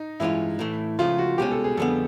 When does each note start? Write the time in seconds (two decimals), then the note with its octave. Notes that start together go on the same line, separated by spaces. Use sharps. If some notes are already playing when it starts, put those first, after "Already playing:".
Already playing: D#4
0.20 G2 E3 G#3 C#4 E4 F4
0.59 A2 E3 A3
0.99 C#2 C#3 F3 A3 F4
1.18 F#4
1.38 C2 B2 G#3 C#4 G4
1.51 A4
1.64 G#4
1.77 F2 D3 G3 B3 A4